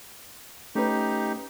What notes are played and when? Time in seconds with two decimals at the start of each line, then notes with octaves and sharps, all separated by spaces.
0.75 A3 C#4 D#4 G4 B4